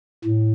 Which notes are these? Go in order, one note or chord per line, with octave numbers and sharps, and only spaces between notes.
A2